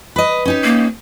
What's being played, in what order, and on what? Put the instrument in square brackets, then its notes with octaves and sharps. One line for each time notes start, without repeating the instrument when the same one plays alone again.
[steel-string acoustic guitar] B4 D#5
C#4 D#4 G4
[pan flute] A#3